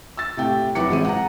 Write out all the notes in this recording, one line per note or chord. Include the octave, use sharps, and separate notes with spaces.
E6 A6
A2 C3 G5
F1 F#3 E4 B4 D6 C#7
A1 G#3 C4 D#7
F#5 A#5